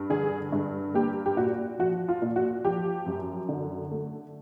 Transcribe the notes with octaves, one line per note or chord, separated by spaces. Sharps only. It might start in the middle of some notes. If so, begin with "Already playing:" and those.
Already playing: G2
D3 G#4
G2
A#3 G4
G4
A#2 F#4
F3 F#4
F4
A#2
F#4
F3 G4
F#2
D3
A3